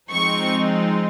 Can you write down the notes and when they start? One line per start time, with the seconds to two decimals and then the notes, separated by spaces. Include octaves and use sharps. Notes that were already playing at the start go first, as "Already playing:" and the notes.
0.10 F3 G#3 C4 D#4 C#6